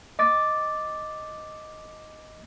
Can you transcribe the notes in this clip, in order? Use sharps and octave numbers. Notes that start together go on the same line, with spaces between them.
D#5 D6 A6